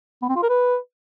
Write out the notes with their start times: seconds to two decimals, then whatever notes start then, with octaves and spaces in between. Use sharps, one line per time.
0.22 B3
0.29 C4
0.36 F4
0.42 A#4
0.49 B4